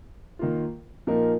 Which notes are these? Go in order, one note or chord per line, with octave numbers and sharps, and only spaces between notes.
D#3 A#3 F4
A#2 F3 A#3 D#4 A#4